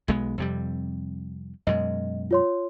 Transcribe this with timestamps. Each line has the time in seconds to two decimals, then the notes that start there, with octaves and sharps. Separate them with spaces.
0.08 B1 G#3 B3
0.38 F2 C3 G3
1.67 F#2 B2 G#3 D#5
2.31 F4 C#5 C6